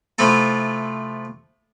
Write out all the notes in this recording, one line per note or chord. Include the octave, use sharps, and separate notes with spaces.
C3 F3 A3 E4 F4 A4